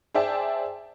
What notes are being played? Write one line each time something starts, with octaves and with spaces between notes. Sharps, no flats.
G#4 C5 D5 E5 G5 A5